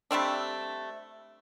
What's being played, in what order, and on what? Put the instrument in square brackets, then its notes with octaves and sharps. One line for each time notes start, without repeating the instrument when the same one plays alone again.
[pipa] G3 A3 C4 D4